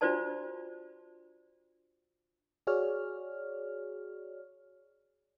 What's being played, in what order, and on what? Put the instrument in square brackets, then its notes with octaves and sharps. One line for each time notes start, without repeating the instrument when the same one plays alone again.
[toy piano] D4 F4 F#4 C5 D5 A5
[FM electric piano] F#4 G#4 C#5 D5 F6